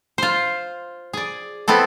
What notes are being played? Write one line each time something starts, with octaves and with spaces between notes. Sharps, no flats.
F4 C5
G#4 D5
B3 C4 E4 A4